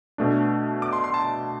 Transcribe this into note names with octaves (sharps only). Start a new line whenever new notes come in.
B2 A3 D4
D6
C6
C6
A5